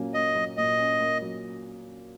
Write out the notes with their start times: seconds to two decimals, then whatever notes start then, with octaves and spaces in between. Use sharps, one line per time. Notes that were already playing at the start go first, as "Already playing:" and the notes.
Already playing: A#2 F#3 A#3 C#4
0.14 A#3 D#5
0.35 F#3
0.57 A#2 D#5
0.78 C#4
1.00 A#3
1.22 F#3